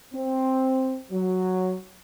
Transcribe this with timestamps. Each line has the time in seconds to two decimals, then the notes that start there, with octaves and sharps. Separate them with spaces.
0.14 C4
1.11 F#3